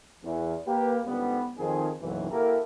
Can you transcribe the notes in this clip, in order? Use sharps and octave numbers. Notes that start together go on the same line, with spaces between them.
E2
A#3 G4 B4
C#2 G#2 D3 G3 B3
F2 D#3 G#4
F#1 B1 E3
A#3 E4 F#4 G4 A4 A#4